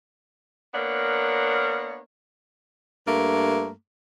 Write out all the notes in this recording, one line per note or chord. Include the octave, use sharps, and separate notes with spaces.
A#3 B3 D4 A#4 C#5
G2 A3 A#3